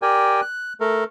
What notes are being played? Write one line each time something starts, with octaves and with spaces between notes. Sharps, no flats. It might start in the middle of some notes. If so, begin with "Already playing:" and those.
G4 A#4 D5 G5 G#5
F#6
A3 A4 A#4